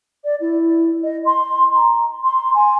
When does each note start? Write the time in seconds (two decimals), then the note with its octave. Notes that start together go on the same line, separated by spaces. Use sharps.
0.24 D5
0.40 E4
1.03 D#5
1.25 C6
1.75 A#5
2.23 C6
2.54 G#5